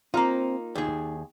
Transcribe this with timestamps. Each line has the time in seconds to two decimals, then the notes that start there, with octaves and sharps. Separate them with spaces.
0.14 A#3 C4 D#4 F4 F5 A#5
0.75 D#2 D#4 G#4